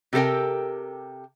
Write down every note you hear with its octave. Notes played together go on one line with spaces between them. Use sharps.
C3 G4 A4 A#4 G5